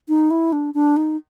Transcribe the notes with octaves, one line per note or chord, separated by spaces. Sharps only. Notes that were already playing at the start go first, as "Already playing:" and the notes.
D#4
E4
D4
D4
D#4